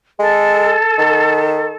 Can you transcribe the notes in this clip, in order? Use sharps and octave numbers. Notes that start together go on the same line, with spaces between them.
G#3 A4
D#3